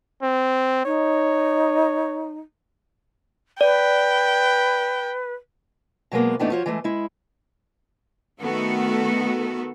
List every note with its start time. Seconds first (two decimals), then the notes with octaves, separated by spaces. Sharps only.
0.22 C4
0.85 D#4 C#5
3.61 B4 D5 G5
6.11 B2 F#3 G#3 A#3 B3
6.39 A2 E3 A3 B3 D4 D#4
6.51 F3 F4 F#4 C5 C#5
6.66 E3 G#3 A3
6.84 G#3 E4
8.41 D#3 A3 B3 F#4 A4